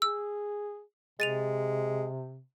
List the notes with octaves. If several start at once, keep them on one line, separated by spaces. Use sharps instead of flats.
G#4 E6
C3 G#3 A6 D#7 F7